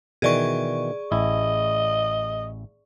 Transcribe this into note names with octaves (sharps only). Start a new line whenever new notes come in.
B2 D#3 E3 G#4 D5 C#6
A1 E4 D#5